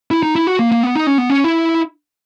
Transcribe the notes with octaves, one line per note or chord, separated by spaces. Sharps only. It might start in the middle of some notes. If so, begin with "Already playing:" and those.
E4
D#4
E4
F#4
A#3
A#3
B3
D#4
C#4
B3
C#4
E4